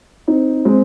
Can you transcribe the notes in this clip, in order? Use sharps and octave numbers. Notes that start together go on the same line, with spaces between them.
C4 D#4
G#3 C4